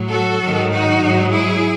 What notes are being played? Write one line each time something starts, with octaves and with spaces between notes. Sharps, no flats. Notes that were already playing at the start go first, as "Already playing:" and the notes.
Already playing: A2 F#3
F#4 A4
G#2 D#3 F#3
D#4 F#4
G#2 F#3
E4 G#4